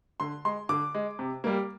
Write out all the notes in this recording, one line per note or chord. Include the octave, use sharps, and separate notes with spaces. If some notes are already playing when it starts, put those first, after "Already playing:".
D3 C6
G#3 C6
D3 D6
G#3
C3
G3 A#3